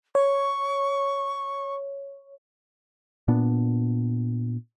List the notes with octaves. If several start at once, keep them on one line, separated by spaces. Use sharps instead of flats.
C#5 C#6
A#2 B3 D4